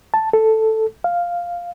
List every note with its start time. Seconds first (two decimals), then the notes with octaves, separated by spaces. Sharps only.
0.14 A5
0.33 A4
1.04 F5